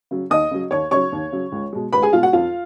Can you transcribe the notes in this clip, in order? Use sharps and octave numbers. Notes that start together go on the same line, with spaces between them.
C#3 F#3
D#2 D#5 D#6
C#3 F#3
D#2 C#5 C#6
C#3 F#3 C#5 C#6
D#2
C#3 F#3
C#2
B2 G#3
C#2 B4 B5
G#4 G#5
B2 G#3 F4 F5
F#4 F#5
F2 F4 F5